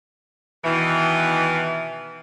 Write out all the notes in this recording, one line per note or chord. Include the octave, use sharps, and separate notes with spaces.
B2 D#3 E3